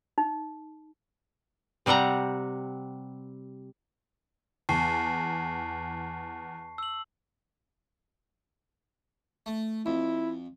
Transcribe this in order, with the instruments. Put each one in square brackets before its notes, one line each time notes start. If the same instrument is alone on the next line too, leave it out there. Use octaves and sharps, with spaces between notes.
[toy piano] D#4
[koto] C3 G3 C4 F#5 A#5
[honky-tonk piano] E2 [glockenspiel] A5 C#6 C7
[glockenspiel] E6 F#7
[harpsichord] A3
[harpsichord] F2 [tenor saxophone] E4